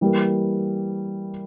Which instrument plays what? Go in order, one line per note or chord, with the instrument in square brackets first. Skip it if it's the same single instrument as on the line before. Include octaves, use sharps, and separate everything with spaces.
[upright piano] E3 G3 A#3